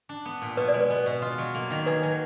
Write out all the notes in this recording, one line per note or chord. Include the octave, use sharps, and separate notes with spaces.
D4
B3
A#2
B2 B4
D5
G#3
B4
B3
B2
F4
F#3
A#3
D#3
G#4 B4
F#3